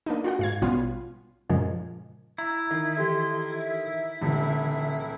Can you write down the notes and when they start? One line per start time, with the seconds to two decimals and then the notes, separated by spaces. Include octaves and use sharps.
0.06 A#3 D4 D#4
0.24 F4 F#4 F#5
0.39 G#2 F5 G#6
0.62 A#1 B2 G3 B3 C#4 F4
1.50 F#2 A#2 C#3 F3 G#3 C#4
2.38 E4 A#5
2.71 D#3 E5
2.97 E3 G4 A4 C6
3.57 E5
4.21 D#1 C#2 D3 E3